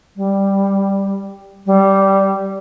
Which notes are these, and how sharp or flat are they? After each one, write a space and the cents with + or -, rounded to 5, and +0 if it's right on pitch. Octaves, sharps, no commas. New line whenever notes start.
G3 +5
G3 -10